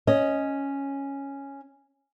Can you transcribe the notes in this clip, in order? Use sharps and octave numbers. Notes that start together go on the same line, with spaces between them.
C#4 D#5